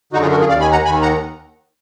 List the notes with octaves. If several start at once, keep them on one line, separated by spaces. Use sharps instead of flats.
F#2 D3 D#4 F#4
F4 G#4
F#4 A#4
F4 G#4
D#2 D#3 D5 F5
G#5 B5
F#5 A#5
D#2 D#3 G#5 B5
F#5 A#5